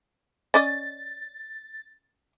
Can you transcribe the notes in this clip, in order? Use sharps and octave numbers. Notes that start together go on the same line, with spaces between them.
C#4 D5 D#5 A6